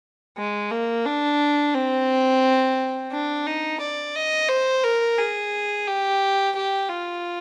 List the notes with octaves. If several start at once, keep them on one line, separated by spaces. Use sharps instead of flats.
G#3
A#3
D4
C4
D4
D#4
D5
D#5
C5
A#4
G#4
G4
G4
F4